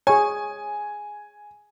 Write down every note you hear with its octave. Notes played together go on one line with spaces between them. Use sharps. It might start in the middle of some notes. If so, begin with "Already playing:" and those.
G#4 C#5 G#5